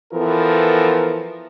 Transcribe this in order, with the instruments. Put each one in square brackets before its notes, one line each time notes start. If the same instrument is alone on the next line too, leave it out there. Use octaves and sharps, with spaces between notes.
[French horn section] E3 F3 B3 A4 A#4